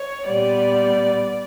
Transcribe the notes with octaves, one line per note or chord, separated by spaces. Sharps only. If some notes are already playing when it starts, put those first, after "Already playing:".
Already playing: C#5
A#2 G3 B3 D5